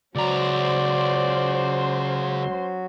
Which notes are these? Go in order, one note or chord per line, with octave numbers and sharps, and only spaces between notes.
C#2 F#3 C#4 F#4 C5 D5 A#5 C6